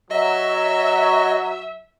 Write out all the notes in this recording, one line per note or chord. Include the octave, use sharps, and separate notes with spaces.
F#3 D#5 E5